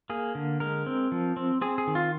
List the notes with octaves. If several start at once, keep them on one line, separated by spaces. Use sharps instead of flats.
A#3 G#4
D3
G#3 A#4
C4
F3
C4
C4 G#4
G#4
D#3
F4